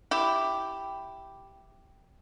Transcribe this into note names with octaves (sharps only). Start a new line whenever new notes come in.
E4 G4